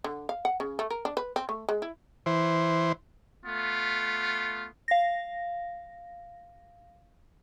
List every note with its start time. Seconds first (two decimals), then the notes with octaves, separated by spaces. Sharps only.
0.04 D3
0.29 F5
0.45 F#5
0.60 C#3
0.79 A3
0.90 A#4
1.05 D4
1.17 B4
1.36 C4
1.49 A3
1.69 G#3
1.82 E4
2.26 E3 C5
3.45 A3 B3 F4
4.88 F5 A#6